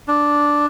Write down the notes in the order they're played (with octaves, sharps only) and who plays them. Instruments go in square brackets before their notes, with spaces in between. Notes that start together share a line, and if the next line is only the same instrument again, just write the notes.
[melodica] D4